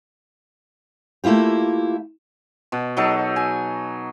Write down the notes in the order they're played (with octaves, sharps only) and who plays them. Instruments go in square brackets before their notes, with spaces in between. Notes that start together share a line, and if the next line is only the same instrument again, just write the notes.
[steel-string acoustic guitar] A3 A#3 E4 F4 G4
[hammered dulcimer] B2
F#3 D#4 A4
G#5